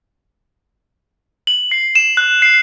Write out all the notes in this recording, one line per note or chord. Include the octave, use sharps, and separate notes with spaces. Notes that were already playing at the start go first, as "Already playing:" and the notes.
F#7
C7
E7
F#6
C7